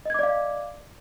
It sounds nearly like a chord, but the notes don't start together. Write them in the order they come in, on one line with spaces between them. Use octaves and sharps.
D#5 G#6 D6 D5 F5